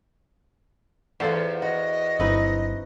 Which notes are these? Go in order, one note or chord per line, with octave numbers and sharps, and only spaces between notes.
E2 F4 A4 C5 F#5
F#4 D#5
G1 F#3 C4 D#4 E4 B4